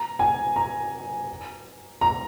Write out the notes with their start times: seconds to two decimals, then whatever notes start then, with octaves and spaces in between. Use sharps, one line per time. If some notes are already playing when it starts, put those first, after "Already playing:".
Already playing: A#5
0.19 G#5
0.56 A#5
2.01 A#5